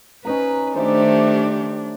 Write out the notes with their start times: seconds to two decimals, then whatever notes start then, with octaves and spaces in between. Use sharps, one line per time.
0.25 C#4 D#4 B4 A#5
0.76 D#3 A3 D4 G4 C5 E5